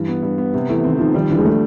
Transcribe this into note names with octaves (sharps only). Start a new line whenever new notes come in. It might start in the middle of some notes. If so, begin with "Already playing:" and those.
Already playing: G2 E3
B3
G2
B3
C3
E3 A3
D#3 C4
D#3 F3
D#3 G3
D3 E3
G#3
A3